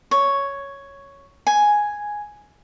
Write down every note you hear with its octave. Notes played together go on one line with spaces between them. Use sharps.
C#5
G#5